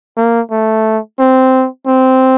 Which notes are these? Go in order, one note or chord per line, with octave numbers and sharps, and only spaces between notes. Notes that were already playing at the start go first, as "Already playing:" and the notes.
A#3
A3
C4
C4